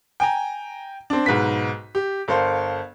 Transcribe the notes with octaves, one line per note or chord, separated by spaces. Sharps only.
G5 G#5 A#5
C4 D4
B1 G#2 B4 B6
G4
G1 A4 A#4 C5 F5